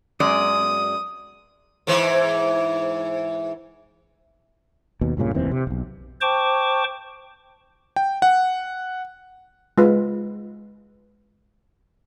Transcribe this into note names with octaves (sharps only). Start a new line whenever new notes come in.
F#2 G#3 D5 D#6
G#2 E3
D#2 B2
C#2 G2 A#2 C#3
F1 D#2 E3 C4
C3
E1 B1
C5 G5 A5 C#6 D6
G5
F#5
G#3 F4 B4